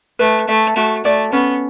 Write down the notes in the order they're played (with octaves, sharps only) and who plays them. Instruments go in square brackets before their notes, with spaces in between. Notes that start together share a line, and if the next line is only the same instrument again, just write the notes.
[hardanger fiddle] A3 [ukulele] B4
[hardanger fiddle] A3 [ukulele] E5
[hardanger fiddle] A3 [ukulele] F#4
[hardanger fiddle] A3 [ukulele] D5
[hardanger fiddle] B3 [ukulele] C#4